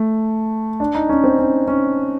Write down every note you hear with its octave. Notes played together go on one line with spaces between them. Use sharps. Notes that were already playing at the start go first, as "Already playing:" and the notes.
Already playing: A3
D4
D#4
C#4
C4
C#4
C#4